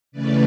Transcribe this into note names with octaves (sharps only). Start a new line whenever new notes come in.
C#3 E3 A3 C#4 B4 D5